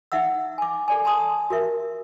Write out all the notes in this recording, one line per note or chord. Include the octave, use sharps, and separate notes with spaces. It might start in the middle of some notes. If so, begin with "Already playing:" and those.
D#4 E5 F#5 E6
G#5 D6
A4 D5 G#5
G#5 A5 C6 D#6
F#4 A#4 E5